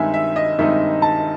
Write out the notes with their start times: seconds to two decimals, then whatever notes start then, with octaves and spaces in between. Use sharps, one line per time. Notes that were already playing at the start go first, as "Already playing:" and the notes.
Already playing: G2 D#3 G#3 C4 D#4 E5 G#5
0.14 E5
0.36 D#5
0.59 G2 D#3 G#3 C4 D#4 E5
1.02 A5